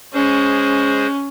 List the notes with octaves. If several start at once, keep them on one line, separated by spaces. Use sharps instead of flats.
G#3 C#4 G#4 C5